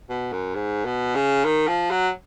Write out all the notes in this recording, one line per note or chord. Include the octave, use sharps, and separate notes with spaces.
B2
F#2
G#2
B2
C#3
D#3
F3
F#3